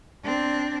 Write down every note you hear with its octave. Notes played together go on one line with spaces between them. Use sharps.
C4 D4